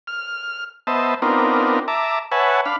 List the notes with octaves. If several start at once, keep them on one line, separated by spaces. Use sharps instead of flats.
F6
B3 C5 D#5 E5 A5
B3 C4 D4 D#4 F4 A#4
E5 A5 A#5 D6
B4 C#5 E5 F#5 G#5 A5
D4 F5 B5